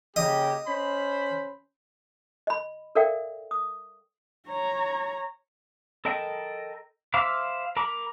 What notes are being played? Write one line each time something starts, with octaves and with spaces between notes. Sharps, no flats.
C#3 A#3 G4 D#5
C#4 C5 B5
D#5 B5
A4 A#4 D5 E5 F5 G5
D#6
C#5 A#5
A4 A#4 D#5 G5 B5
C5 E5 F5 B5 D6
A#4 A#5 B5 D6